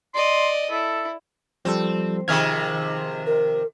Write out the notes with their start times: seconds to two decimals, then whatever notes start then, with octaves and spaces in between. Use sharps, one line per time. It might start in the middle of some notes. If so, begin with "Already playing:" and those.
0.14 D5 D#5 C6
0.70 E4 A4
1.65 F3 G3 C4 A4
2.28 C3 D#3 F3 G#4 F6 G#6
3.27 A#4